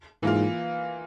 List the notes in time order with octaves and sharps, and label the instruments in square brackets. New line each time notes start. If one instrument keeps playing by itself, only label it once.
[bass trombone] G#2 [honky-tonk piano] E3 A#3 F4